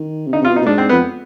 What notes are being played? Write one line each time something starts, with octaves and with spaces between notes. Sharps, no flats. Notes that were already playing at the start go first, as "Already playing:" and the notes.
Already playing: D#3
C3
D3 D#4
C3 F4
B2
D#4
B2
G#2 D4
C4
B3
F2